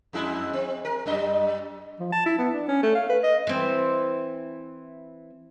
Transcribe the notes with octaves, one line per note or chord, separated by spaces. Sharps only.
F2 G#3 E4
C4
A#4
F#2 G3 D#5
F3
A5
E4
B3
D4
C#4
A3
F5
B4
D#5
E3 C4